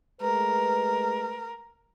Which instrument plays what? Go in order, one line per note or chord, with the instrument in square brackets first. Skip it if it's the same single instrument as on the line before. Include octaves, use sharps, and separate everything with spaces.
[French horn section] G#3 A3 B4 [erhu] A#4